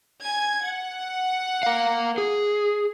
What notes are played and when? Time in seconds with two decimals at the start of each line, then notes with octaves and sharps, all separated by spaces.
0.23 G#5 G#6
0.63 F#5
1.63 A#4 F5
2.18 G#4